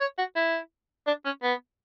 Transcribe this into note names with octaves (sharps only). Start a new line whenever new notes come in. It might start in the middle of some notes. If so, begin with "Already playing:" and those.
C#5
F#4
E4
D4
C#4
B3